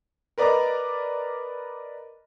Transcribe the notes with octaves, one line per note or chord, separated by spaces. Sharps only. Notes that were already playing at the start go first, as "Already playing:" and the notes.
A#4 B4 D5 D#5 A#5 D6